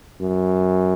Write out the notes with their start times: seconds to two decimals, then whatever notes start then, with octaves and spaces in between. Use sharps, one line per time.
0.20 F#2